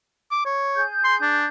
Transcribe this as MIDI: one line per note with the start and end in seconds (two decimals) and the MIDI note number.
0.32 0.45 86
0.45 0.83 73
0.75 1.47 68
0.75 1.47 91
1.04 1.16 84
1.22 1.46 62